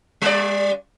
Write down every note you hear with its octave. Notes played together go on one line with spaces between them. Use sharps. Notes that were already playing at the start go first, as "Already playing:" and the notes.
G3 D5